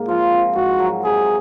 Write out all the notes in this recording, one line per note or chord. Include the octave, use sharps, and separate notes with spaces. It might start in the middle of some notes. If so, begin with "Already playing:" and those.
Already playing: G#2 A#3
F3 F4
C4
G#2 F#4
F#3
C3 G#4